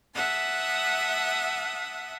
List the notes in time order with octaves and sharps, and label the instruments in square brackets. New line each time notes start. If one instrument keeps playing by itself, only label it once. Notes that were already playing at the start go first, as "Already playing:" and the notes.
[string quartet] E5 F#5 A5 D#6